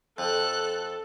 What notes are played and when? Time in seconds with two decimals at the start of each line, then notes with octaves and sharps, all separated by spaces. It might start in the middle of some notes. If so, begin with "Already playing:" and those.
0.18 F2 A4 F#6